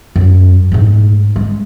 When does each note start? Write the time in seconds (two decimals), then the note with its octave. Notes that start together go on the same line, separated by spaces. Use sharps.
0.16 F#2
0.72 G#2 A3
1.36 G#3